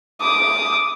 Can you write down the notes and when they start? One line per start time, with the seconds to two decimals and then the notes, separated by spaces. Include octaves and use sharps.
0.21 D6 D#6